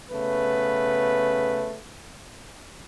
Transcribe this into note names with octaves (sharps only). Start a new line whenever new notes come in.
C#3 A3 B3 B4